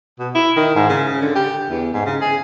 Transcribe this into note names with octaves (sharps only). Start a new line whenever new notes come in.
B2
E4
D#3
G#2
C#3
D3
G4
E2
G#2
C#3
G#4